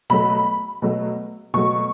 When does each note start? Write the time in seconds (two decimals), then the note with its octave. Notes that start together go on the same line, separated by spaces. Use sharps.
0.10 B2 F#3 A3 B5
0.82 B2 F#3 A3
1.54 B2 F#3 A3 C#6